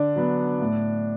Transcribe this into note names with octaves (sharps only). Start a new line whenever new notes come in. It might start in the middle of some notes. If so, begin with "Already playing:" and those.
Already playing: D3 D4
F#3 B3
A2